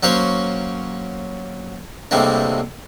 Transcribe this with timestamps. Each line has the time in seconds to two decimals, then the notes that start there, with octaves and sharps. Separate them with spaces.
0.03 F#3 A#3 C#4 F#4 C5 C#5
2.11 A2 C3 G3 G#3 A#3 D4